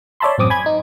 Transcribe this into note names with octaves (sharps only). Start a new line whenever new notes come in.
C#5 D5 E5 A5 B5 C6
A1 F#2 C4 D6 D#6
G#5 B5 G#6
D#4